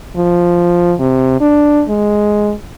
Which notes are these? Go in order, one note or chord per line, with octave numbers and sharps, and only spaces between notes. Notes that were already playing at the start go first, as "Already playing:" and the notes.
F3
C3
D4
G#3